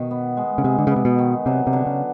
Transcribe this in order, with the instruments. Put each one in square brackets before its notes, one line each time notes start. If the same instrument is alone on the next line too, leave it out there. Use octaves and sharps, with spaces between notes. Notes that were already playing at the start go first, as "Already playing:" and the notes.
Already playing: [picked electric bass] B2 [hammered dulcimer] D#3
[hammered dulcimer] B3
G#3
[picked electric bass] C#3
[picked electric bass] C3 [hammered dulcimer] G#3
[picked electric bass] D3
C#3
[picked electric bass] C3 [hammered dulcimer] B3
[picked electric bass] B2
[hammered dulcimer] D#3
[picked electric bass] C3 [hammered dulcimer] F#3
[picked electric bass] C3
[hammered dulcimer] D3
[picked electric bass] C#3